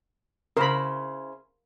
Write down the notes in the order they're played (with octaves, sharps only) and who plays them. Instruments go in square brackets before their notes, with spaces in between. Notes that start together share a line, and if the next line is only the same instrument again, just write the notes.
[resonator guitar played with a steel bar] C#3 E4 C5 [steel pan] A#4 B5